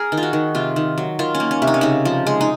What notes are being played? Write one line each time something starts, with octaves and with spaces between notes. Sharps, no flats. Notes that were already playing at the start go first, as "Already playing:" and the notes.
Already playing: G#4 A#4
D#3
F4
F#4
D#3
C3 F4
D#3
F#3
D#3 F4
C#4
A#3
C#4
C3
D#4
C#4
C#3 D#4
F3
G#3
D#4